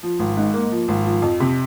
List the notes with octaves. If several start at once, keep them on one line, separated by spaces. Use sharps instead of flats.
F3
G#1
G#2
A#3
F3
G#1
F3
F2
C3